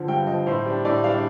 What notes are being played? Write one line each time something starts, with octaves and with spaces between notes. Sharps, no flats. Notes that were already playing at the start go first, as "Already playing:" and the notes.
Already playing: D3 F3
G2 G5
D3 F3 D#5
A2 C5
G3 D4
A2 D5
G3 D4 F5
D5